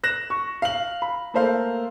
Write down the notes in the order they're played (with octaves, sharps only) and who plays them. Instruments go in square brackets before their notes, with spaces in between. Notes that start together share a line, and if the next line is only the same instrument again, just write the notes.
[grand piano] F#6 A#6 E7
C#6
F5 F#7
B5
A3 A#3 A4 C5 F5